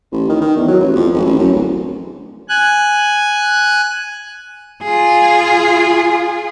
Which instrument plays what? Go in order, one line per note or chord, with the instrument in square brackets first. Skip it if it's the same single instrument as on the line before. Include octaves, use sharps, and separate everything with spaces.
[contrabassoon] A1
D#3
D#3
E2
F#3
A1
F2
G#1
A1
F#2
D1
[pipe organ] G#5 F#6
[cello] F4 G#4